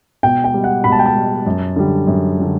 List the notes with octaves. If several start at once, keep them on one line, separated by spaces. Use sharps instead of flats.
B2 G5
G5
G3
F#5
B2 B5
A5
G5
A5
G3
F#2
D3 G3
F#2
D3 G3